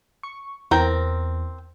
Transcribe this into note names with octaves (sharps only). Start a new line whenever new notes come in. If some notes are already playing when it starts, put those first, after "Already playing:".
C#6
E2 C4 A#4 G5